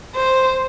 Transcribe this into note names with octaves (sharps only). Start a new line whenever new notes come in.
C5